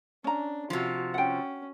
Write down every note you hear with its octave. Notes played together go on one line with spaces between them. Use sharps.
C#4 D4 A#5
C3 F3 F#4
C#4 F#5 G5